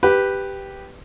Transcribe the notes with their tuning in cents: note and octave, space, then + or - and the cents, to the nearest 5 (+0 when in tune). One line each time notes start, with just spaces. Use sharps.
G4 +0 B4 +0